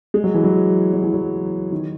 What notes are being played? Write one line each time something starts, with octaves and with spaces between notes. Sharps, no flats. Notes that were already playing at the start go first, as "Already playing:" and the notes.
G#3
F#3
E3
F#3
F#3
E3
F#3
D#3